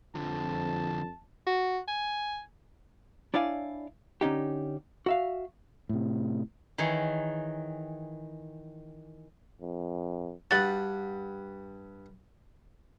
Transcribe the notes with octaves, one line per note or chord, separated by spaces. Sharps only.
F2 D3 F3 A5
F#4
G#5
D4 E4 C#5 D5 F5 G#5
D3 C#4 D#4 G4
F#4 E5 F5
A2 C3
D#3 E3 G#4 C#5
F2
G2 F#4 G4 F#5 D#6 A6